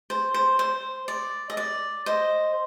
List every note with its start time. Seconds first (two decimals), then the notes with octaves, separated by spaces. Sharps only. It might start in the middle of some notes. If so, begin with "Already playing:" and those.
0.10 C5
0.34 C5
0.59 C5
1.08 D5
1.50 D#5
1.57 D5
2.06 C5 D#5